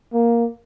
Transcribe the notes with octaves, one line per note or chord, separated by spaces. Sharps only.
A#3